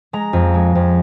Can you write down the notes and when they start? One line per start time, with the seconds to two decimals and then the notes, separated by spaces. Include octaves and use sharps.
0.13 G#3 A#5
0.33 F2
0.54 G#3
0.75 F2